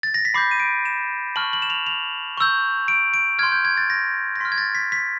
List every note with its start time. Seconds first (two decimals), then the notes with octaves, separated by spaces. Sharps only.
0.03 A6
0.14 A#6
0.25 B6
0.34 B5 D6 G6 C7
0.51 D#7
0.60 D7
0.85 E7
1.36 A5 C#6 F6 F#7
1.53 F#7
1.62 E7
1.70 F7
1.86 F7
2.38 C#6 E6 G6
2.88 D7
3.14 D7
3.39 C6 F6 G#6
3.52 G6
3.65 G#6
3.77 A6
3.90 A#6
4.36 A#6
4.40 C6 F6 B6
4.52 G#6
4.58 A6
4.75 B6
4.92 B6